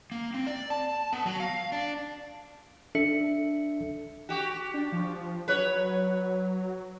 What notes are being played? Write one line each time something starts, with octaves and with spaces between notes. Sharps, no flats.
A#3
C4
D5
A5
B3
F#3
F5
D4
D4 A4 E5 C#7
F#4 G4
D4
F3
F#3 B4 C#5